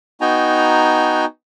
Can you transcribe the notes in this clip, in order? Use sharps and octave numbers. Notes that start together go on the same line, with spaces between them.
B3 D#4 F#4 G5 G#5 A#5